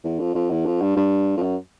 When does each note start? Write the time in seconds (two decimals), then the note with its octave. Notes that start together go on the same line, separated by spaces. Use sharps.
0.04 E2
0.19 F2
0.35 F2
0.51 E2
0.66 F2
0.81 G2
0.96 G2
1.37 F2
1.42 F#2